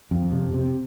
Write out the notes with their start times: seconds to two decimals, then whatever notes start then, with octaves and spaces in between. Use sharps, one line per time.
0.11 F2
0.32 C3
0.54 C3